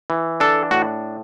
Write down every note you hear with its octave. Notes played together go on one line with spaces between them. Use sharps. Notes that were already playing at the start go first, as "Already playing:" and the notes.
E3
D4 A4
A2 F#4